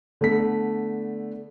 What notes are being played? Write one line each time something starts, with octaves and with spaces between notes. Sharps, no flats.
D3 A3 B3 B6